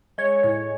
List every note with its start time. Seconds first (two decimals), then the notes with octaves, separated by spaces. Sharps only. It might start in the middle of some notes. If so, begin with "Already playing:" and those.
0.18 G#3 C#5
0.43 A2 C#5